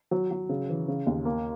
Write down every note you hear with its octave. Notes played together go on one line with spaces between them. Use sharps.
F#3
F#3
C#3
E3
C#3
D#2
A#3